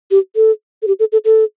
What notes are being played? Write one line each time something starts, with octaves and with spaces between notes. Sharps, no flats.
G4
A4
A4
G4
A4
A4
A4